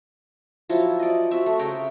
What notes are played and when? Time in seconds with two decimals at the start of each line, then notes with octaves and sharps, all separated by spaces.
0.69 F3 F#3 E4 F4
0.99 D5 D#5
1.31 C4 F#4 E5
1.46 A3
1.59 C#3 G5 A#5